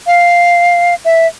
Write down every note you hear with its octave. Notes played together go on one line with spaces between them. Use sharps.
F5
E5